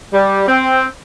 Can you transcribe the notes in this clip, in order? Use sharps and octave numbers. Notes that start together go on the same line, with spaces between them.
G3
C4